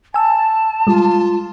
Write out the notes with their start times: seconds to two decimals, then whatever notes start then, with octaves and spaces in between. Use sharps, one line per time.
0.14 G#5 A5 E6
0.87 G3 G#3 F4